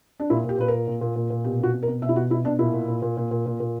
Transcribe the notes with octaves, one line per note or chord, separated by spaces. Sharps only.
D4
A#2 E4
A#2 G4
A#2 B4
A#2 A#4
A#2
A#2
A#2
A#2
B2 G4
B2 F#4
B2
A#4
B2
B2 E5
E4
B2 F#4
B2 E4
B2 D4
A#2 E4
A#2
A#2
A#2
A#2
A#2
A#2
A#2